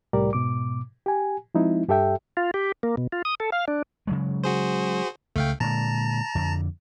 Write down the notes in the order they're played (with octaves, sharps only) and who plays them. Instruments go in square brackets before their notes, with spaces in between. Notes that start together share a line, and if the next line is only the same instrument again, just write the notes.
[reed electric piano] C2 A2 G3 G4 A#4 D5
G#2 B2 D6
G4 G#5
F3 G#3 C4 D#4 E4
G2 G4 A4 E5 G5
[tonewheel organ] F4
G4
A#3
B2
F4
D#6
A4
F5
D4
[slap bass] C#3 F#3 G#3
[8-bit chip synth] F#4 G#4 C5
[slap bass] C#2 C#3 [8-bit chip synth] A3 F5 G5
[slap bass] A#2 D3 G#3 [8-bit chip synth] A5 A#5
[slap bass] F2 D3